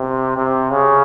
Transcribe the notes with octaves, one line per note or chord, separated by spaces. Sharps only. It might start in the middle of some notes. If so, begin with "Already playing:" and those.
Already playing: C3
C3
C#3